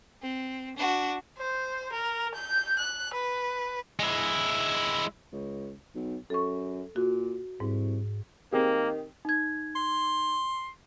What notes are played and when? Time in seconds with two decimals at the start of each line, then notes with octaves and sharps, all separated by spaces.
0.22 C4
0.77 D4 F#4
1.38 C5
1.92 A#4
2.34 G6
2.79 F#6
3.13 B4
4.00 G#3 E4
5.33 C#2
5.95 B1
6.30 F#2 A4 C#6
6.96 A#2 F#4
7.60 C2 G#2
8.52 D#3 A#3 C4 G4 G#4
9.25 D#4 G#6
9.76 C6